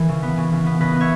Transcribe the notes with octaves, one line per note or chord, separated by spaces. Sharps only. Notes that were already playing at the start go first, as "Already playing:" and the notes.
Already playing: E3 A#4
C#3
B3
C#3
C#3
B3
C#3 B4 D#5
B3
C#5 E5